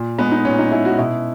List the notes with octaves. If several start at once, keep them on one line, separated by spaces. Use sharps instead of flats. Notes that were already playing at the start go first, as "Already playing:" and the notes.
Already playing: A#2
G#3 B3
D#4
A#2 C#4
D#4
G#3 E4
F#4
B2 E4